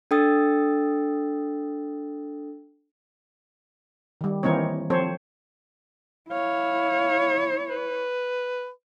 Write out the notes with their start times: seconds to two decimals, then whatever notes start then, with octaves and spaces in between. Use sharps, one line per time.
0.11 D4 A4 G5 D#6 E6 A6
4.21 D#3 G3
4.43 D#3 E3 A#3 C4 D#4 C#5
4.90 F3 C4 A4 C5 C#5
6.31 E4 C#5 F5
7.70 B4